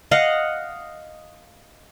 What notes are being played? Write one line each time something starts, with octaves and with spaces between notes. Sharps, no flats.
D#5 F5 F#5